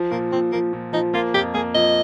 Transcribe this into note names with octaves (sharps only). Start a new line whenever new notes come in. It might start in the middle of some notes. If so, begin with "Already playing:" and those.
Already playing: F3
A#2 A#3
A#2 C4
F3 A#3
A#2
F3 D#4
A#3 F4
F2 G4
A#3 G#4
F2 D#5